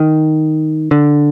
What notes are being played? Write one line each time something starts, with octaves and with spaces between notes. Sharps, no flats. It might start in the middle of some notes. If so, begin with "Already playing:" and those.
Already playing: D#3
D3